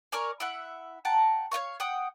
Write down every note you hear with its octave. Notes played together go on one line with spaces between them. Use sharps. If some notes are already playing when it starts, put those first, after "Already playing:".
A#4 C#5 D5 G#5
E4 E5 F#5
F#5 G5 A5 A#5
C#5 D#5 F5 C#6
F#5 G5 D#6